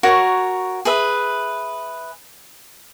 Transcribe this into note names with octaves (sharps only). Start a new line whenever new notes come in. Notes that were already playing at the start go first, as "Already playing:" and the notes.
F#4 A#4 C#5
G#4 B4 E5